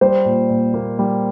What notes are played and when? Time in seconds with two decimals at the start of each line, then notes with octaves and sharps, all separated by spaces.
0.01 G3 C5
0.25 A#2
0.49 A#2
0.74 A#3
0.99 G3